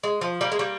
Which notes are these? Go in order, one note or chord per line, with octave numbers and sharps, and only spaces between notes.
G#3
F3
G3 A#3
G#3
G3 A#3